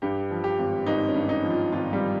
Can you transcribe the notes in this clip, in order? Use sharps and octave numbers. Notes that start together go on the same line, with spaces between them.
G2 G4
F3
G4
G#1
G#1 D#4
C#4
G2
D#4
F3
F4
G#1 F4
G3